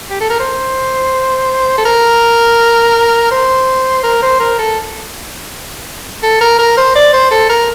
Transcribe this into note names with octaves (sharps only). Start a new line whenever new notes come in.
G4
A4
A#4
C5
A4
A#4
C5
A#4
C5
A#4
A4
A4
A#4
A#4
C5
D5
C5
A4
A#4